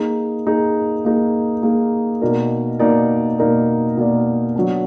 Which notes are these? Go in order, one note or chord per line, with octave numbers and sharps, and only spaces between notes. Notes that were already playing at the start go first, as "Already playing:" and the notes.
Already playing: A#3 D#4 G#4
A#3 D#4 G#4
A#3 D#4 G#4
A#3 D#4 G#4
B2 A#3 D#4 A#4 D5
B2 A#3 D#4 A#4 D5
B2 A#3 D#4 A#4 D5
B2 A#3 D#4 A#4 D5
F#3 B3 D4